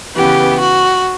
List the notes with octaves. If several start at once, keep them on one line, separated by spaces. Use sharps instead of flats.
C#3 E3 B3 G4
F#4